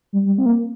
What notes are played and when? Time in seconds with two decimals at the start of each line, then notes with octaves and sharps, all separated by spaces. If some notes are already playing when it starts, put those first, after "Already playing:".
0.13 G3
0.26 G3
0.38 C4
0.46 A#3